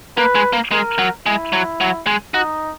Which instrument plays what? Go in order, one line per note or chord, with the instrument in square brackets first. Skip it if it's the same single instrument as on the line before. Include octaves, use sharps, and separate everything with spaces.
[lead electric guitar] A#3 [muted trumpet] B4
[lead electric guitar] G#3
A#3
[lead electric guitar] G#3 [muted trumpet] A#4
[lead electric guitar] F#3
[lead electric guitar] G#3 [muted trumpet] E4
[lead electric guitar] F#3
F#3
G#3
[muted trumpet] D#4 [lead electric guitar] F#4